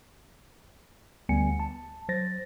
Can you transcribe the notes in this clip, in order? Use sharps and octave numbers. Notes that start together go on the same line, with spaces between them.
D2 G3 B3 G#5 C#7
A5
F#3 C5 A6 A#6